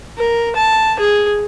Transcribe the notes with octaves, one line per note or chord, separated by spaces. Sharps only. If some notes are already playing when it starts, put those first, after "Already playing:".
A#4
A5
G#4